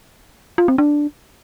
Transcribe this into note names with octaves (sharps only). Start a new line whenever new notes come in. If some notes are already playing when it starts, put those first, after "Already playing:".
F4
C4
D4